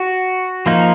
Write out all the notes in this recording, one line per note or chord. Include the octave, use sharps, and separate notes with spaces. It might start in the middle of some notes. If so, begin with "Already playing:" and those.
Already playing: F#4
F3 A#3 D#4